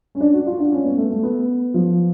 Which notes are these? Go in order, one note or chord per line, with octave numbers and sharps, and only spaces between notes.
C#4
D4
F#4
F4
D4
C#4
B3
A3
A3
B3
F3